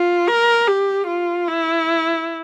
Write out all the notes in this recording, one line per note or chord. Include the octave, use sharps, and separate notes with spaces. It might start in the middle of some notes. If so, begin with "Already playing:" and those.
Already playing: F4
A#4
G4
F4
E4